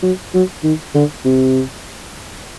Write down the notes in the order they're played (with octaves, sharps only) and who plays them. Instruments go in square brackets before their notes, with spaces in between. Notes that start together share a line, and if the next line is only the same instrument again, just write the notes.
[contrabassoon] F#3
F#3
D#3
D3
C3